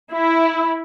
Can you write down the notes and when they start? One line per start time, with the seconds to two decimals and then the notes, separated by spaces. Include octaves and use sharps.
0.12 E4